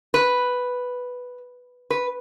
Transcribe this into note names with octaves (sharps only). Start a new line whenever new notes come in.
B4
B4